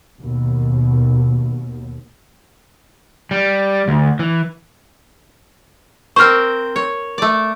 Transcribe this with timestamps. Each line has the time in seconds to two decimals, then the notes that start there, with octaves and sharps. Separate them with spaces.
0.20 D#2 B2
3.31 G3
3.88 D2
4.19 E3
6.16 C4 A#4 C5 C#6 F6
6.76 C#5
7.18 A3 D5